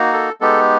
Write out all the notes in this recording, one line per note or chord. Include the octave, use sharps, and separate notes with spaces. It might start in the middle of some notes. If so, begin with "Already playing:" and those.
Already playing: A#3 D#4 F#4
A4
G#3 B3 D#4 G4 A4